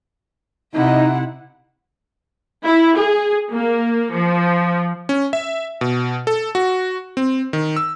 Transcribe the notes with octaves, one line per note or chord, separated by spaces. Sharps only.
C3 D#4 E4 F#5
E4
G#4
A#3
F3
C#4
E5
B2
A4
F#4
C4
D#3
E6